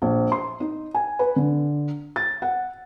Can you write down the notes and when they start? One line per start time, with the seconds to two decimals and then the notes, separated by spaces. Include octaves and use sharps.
0.02 A#1
0.32 C6
0.60 D#4
0.94 G#5
1.19 B4
1.36 D3
2.16 A6
2.42 F#5